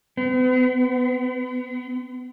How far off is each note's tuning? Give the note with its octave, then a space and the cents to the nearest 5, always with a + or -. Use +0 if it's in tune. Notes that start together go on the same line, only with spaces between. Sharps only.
B3 +40